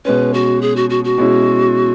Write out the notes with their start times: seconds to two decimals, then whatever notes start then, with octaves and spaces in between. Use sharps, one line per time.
0.05 B2 G#3 C#4 B4
0.34 F#4
0.61 G#4
0.76 F#4
0.90 F#4
1.04 F#4
1.18 B2 G#3 C#4 E4